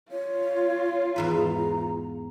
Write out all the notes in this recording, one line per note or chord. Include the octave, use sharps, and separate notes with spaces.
F4 C#5
E2 G#2 B4 A#5